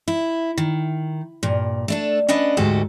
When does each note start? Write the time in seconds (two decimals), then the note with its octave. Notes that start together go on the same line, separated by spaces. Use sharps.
0.08 E4
0.58 D#3
1.43 G2 A#2
1.88 A3 D4 A4
2.29 C#4 D4 B4 D#5 F#5
2.57 D2 G#2 F#4 G4 A4